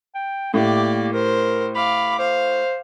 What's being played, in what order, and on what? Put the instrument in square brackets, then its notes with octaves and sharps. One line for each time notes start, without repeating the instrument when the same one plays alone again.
[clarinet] G5
[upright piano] A2 [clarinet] A#3 [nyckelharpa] G4 D5
[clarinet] A#4 [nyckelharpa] C5
[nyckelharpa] F5 D6 [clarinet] B5
[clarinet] C5 [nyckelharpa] F5